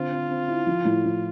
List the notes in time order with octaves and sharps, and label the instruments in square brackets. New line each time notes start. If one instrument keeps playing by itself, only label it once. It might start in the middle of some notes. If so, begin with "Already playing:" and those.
Already playing: [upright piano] D3 C4 [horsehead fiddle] F4
[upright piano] C4
C4
E4
F3
A2
F3